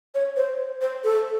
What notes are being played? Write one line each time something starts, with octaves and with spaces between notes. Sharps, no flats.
C#5
C5
C5
A4